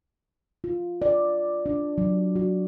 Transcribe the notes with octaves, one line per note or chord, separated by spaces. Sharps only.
F4
D5
D4
F#3
F#4